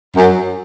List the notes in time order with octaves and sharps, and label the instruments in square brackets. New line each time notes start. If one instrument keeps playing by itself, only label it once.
[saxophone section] F#2